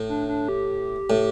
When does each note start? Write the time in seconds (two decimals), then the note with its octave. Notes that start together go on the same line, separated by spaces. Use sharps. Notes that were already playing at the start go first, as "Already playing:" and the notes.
Already playing: A2
0.09 D4
0.28 D4
0.48 G4
1.10 A2